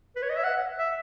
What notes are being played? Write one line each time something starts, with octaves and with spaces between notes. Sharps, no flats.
B4
C#5
D#5
E5
F#5
E5